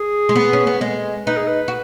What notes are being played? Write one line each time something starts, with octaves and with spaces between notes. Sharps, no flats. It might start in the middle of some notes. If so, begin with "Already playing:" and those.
Already playing: G#4
G#3
B3
C#4
B3
G#3
D#4 B4
G#4
B4
F#4